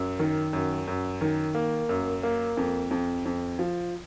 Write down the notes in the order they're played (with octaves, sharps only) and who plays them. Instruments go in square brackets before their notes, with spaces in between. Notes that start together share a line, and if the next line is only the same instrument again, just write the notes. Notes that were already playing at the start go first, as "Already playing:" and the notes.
Already playing: [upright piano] F#2
D#3
F#2
F#2
D#3
A#3
F#2
A#3
F2
F2
F2
F3